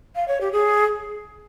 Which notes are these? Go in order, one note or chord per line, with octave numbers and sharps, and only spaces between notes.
F5
C#5
G4
G#4